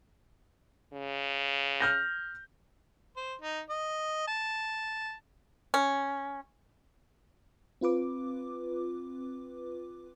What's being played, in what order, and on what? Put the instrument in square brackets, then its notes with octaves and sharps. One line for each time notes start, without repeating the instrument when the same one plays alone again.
[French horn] C#3
[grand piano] F6 G6 A#6
[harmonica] C5
D#4
D#5
A5
[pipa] C#4
[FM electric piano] C4 F4 B4 D6